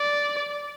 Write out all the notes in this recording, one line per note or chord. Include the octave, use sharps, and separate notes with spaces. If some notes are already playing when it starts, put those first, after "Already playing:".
Already playing: D5